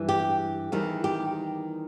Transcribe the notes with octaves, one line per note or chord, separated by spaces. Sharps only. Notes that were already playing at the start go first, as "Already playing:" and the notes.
Already playing: G2 E3 G3
G4
E2 D#3 G3
G4